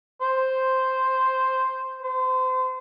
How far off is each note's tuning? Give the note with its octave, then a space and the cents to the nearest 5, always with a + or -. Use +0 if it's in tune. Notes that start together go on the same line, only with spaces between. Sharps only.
C5 +0
C5 -30